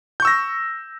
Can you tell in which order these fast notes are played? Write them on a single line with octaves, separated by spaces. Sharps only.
G6 C#6 E6 A#6